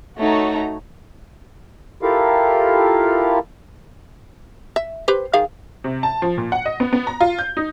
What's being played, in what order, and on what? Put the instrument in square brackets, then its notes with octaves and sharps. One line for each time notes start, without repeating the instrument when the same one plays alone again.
[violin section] A3 D#4 F#4 C#5 A#5
[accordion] E4 F4 G4 A4 A#4 F5
[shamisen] E5
G4 B4 C5
D#3 G#4 F5
[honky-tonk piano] C3
A5
F3
A#2
F#5
D#5
B3
B3
A#5
F4
G6
D#4